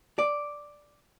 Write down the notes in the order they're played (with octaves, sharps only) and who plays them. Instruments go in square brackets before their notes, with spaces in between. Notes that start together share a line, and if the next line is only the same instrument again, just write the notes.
[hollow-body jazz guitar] D5